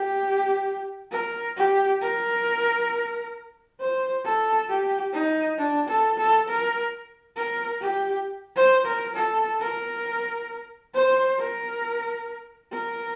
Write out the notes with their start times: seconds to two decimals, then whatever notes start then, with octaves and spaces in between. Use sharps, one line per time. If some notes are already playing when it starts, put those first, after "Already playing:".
Already playing: G4
1.12 A#4
1.57 G4
2.01 A#4
3.80 C5
4.25 A4
4.69 G4
5.13 D#4
5.58 D4
5.89 A4
6.18 A4
6.48 A#4
7.36 A#4
7.82 G4
8.56 C5
8.86 A#4
9.15 A4
9.60 A#4
10.94 C5
11.39 A#4
12.72 A#4